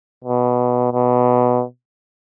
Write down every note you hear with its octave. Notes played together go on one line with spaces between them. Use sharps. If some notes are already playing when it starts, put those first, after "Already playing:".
B2
B2